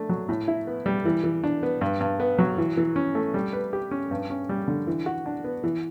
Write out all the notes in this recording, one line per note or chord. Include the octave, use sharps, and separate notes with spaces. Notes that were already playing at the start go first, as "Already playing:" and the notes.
Already playing: A3 D4
F#3
A2
E4
B3
G3
E3
E3
D4
B3
G2
G2
B3
F#3
E3
E3
C#4
A3
G3
B4
G4
C#4
G2
C#4
G3
D3
E3
F#4
D4
B3
E3